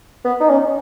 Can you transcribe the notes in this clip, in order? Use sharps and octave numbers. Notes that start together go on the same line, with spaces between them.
B3
D#4
C#4